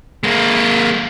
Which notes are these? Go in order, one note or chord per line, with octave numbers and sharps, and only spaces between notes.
G#3 A#3